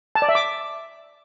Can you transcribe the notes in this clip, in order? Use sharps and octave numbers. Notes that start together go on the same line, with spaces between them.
A5
D5
E5
D6